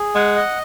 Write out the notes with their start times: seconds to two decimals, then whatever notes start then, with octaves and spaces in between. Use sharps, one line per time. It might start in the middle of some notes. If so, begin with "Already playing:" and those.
Already playing: G#4
0.15 G#3 F#5
0.36 D#5